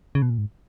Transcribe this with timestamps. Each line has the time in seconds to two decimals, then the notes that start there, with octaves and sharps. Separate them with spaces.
0.15 C#3
0.22 B2
0.30 A#2
0.38 G#2